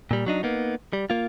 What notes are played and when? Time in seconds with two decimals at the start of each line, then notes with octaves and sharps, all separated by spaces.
0.11 A#2 G3
0.26 F#3 D4 D#4
0.43 A#3 B3 D#4
0.93 G3
1.10 A#3 F4